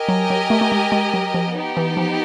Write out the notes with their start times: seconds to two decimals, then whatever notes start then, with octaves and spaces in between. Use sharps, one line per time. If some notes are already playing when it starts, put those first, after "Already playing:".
Already playing: G4 A#4 D#5 G#5
0.09 F#3
0.30 F#3
0.50 A3
0.61 A3
0.72 G#3
0.92 G#3
1.14 F#3
1.34 F3
1.56 B3 D#4 G4
1.77 E3
1.97 F3